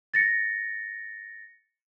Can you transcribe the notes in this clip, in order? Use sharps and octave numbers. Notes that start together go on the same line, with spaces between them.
A6 A#6 C#7